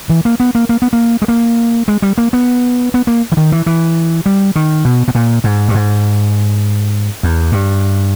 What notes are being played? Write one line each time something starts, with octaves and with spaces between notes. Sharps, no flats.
E3
A#3
B3
A#3
A#3
B3
A#3
G#3
A#3
G#3
G3
A#3
B3
B3
A#3
E3
D#3
E3
E3
G3
D#3
B2
B2
A#2
G#2
G2
G#2
E2
G2